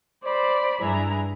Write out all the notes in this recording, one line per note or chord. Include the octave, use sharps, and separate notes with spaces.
C5 D5 B5
G2 D4 E4 G#4 A#5